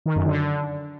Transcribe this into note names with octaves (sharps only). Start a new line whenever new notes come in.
D#3
F#2
D3